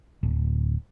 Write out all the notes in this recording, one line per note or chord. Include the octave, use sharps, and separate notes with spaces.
D1